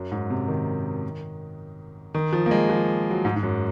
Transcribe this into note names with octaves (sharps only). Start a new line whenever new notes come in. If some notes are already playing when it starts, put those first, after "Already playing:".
Already playing: F#2
G#2
C3
D#3
D#3
F3
A#3
G#3
F3
F#3
G#2
G#2
F#2